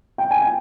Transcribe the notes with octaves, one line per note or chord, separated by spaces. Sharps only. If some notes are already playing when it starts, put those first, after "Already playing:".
G5
G#5
G5